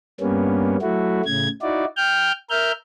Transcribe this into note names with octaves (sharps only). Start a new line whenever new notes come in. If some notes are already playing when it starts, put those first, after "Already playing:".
G2 G3 A#3 B3 C#4
F#3 A3 E4 F#4
A2 C#3 G#6
D#4 E4 F#4 D5
G5 F6 G6
A#4 E5 F6 G6